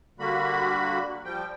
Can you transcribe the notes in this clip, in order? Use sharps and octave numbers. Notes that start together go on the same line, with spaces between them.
D3 G3 A#3 F#4 B5
F3 G3 G5